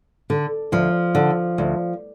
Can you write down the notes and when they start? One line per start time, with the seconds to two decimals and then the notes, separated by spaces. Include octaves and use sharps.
0.30 D3
0.72 D2 F3
1.15 D3
1.58 D2